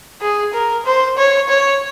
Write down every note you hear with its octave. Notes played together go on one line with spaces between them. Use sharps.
G#4
A#4
C5
C#5
C#5